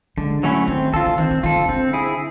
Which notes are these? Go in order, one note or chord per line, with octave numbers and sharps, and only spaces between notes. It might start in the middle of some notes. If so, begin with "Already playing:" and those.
D3 G#3
F#3 A3 C#4 E4
D#3 C4
D3 F4 A4
D3
D#3 C4
D#3
D#3 F4 A4
D3
D3 C4
E4 G#4